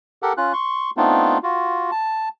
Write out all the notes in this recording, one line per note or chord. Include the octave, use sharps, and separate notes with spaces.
G4 A4 A#4 F#5
C#4 F4 F#6
C6 C#6
A3 B3 C4 D4 D#4 F4
F4 F#4
A5